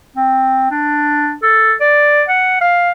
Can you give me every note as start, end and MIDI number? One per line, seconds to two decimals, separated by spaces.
0.16 0.70 60
0.71 1.34 62
1.42 1.73 69
1.81 2.22 74
2.29 2.58 78
2.61 2.91 77